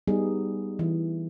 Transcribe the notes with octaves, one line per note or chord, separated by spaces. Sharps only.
G3 B3 D#4 G#4
E3